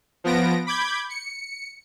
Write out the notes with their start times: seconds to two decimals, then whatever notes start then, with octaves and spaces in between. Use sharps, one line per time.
0.24 F3 B3 A#6 D7
0.67 B5 D6 G6 G#6
1.10 C#7